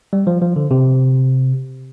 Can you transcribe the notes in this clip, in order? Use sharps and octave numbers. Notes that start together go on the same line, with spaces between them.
G3
F3
F3
D3
C3